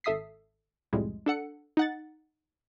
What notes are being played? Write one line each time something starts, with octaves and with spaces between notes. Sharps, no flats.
G#1 A4 E5 D#6 B6 C7
C2 F2 A2 G3 G#3
D4 A4 F#5 C#7
D#4 F#5 A6